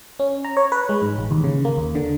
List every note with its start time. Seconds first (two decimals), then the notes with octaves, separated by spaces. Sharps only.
0.19 C#4
0.44 A#5
0.57 C#5
0.72 B4
0.89 G#3
1.02 G#2
1.18 A1
1.31 D#2
1.44 C#3
1.65 A#3
1.77 D#2
1.95 D3